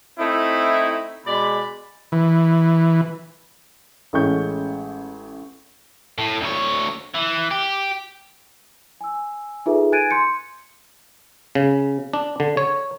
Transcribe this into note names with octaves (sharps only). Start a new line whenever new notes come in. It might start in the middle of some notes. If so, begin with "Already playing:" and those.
A3 C4 D#4 E4
B2 G#3 D5 B5
E3
A1 G#3 A3 C#4 C#6 G6
A2
D2 C#5
E3
G4
G#5 E6
D#4 F4 G#4 A4 B4 E5
G#5 F#6 G#6 A6 D7 D#7
C6 G6 C#7
C#3
D4
D3
C#5